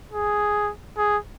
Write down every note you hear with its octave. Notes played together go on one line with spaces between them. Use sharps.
G#4
G#4